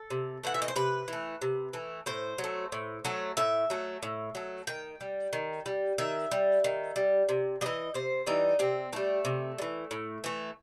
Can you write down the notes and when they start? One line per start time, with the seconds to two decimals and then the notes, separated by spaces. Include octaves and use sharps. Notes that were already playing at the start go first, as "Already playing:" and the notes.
Already playing: A4
0.10 C3
0.43 E3 A3 F#5
0.54 E5
0.62 D#5
0.68 C5
0.76 C3 B4
1.08 E3 A3
1.42 C3
1.73 E3 A3
2.06 A2 C5
2.38 F#3
2.44 A3
2.72 A2
3.05 F#3 A3
3.37 A2 E5
3.70 F#3 A3
4.03 A2
4.35 F#3 A3
4.67 D#3 G5
5.01 G3
5.33 D#3
5.66 G3
5.98 D#3 E5
6.31 G3
6.64 D#3
6.96 G3
7.29 C3
7.61 E3 G3 D#5
7.94 C3 C5
8.26 E3 G3 D#4
8.59 C3 C4
8.93 E3 G3 A3
9.25 C3
9.58 G3
9.62 E3
9.91 A2
10.24 E3 A3